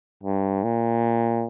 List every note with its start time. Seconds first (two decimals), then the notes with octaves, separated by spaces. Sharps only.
0.23 G2
0.63 A#2